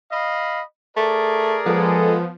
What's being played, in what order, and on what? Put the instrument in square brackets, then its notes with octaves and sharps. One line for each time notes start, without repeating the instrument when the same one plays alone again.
[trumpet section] D#5 F5 B5
[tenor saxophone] A3 [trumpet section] G#4 A#4 D5
[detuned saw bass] F3 [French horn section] G#3 A4 [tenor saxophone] B3